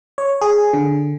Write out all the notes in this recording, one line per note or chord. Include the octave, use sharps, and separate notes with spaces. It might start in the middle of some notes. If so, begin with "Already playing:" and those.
C#5
G#4
D3